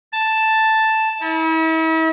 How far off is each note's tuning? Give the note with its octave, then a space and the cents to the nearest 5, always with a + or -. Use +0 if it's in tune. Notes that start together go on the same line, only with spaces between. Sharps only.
A5 +0
E4 -40